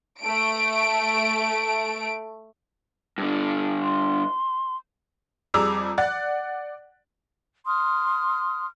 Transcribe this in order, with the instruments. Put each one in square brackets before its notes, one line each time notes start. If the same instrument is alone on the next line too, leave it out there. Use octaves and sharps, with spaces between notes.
[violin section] A3 D7
[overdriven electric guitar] G2 D3
[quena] C6
[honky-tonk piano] F2 G3 G#4 A#5 D6 E6
D5 F#5 F#6 A6
[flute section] C6 D#6 F6